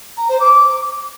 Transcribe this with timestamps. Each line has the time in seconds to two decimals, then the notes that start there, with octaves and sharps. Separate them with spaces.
0.17 A#5
0.29 C5
0.40 D6